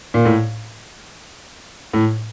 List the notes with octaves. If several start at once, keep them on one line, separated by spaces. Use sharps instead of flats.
A#2
A2
A2